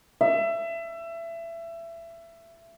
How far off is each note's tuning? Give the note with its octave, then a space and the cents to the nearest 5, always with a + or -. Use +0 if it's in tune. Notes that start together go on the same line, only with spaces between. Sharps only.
E5 +25